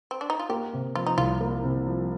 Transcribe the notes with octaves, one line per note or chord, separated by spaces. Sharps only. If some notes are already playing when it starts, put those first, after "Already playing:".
C4
D4
D#4
F4
A#3 G4
C3
F3 F4
D#4
C2 F4
A#3
C3
F3